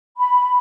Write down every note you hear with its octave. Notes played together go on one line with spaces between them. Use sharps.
B5